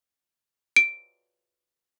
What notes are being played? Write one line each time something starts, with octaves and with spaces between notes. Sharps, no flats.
D7